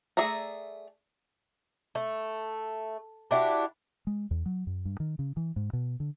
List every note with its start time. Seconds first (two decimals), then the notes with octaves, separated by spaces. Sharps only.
0.17 A3 G#4 D5 E5 A#5
1.95 A3
3.31 D4 E4 F#4 G4
4.07 G#3
4.31 E2
4.46 F#3
4.67 F#2
4.85 G2
5.00 D#3
5.19 C#3
5.37 E3
5.56 G#2
5.73 B2
6.00 D3